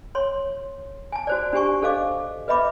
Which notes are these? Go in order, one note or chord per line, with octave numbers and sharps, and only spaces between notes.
C#5 C6
G#5 A5
F#4 C5 D5
D4 G4 G#5 C#6
D4 A4 C5 D#5 F5 D6
B4 D#5 E5 B5 D6